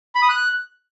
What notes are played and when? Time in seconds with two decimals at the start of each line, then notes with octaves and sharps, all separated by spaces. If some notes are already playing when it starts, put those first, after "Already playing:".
0.15 B5
0.22 D#6
0.29 F#6